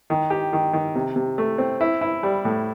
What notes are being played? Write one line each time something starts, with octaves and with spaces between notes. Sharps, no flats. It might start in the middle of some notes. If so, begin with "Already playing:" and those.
D#3
G4
D#3
D#3
C3
C3
A3
C4
E4
E4
G3
A2